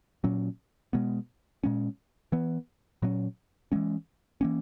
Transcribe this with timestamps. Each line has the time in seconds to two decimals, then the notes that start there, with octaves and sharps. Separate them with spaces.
0.24 A#2 F#3 C#4
0.93 B2 G#3 B3
1.64 A#2 G#3 C#4
2.32 E3 B3
3.02 A#2 F#3 A#3 C#4
3.72 E3 G#3 C#4
4.41 E3 A#3 C#4